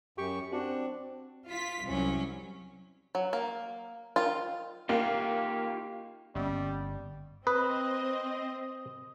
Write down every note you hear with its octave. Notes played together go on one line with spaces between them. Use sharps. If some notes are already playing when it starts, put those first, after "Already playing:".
F#2 G4 C#6
C4 D4 F#4
F4 B6
C2 F#3 C#4
F#3
A#3
D#3 F4
A#3 D#4 F4 G4
G1 G3 A#3 B3 C#4
C4 B4 D#5 D#6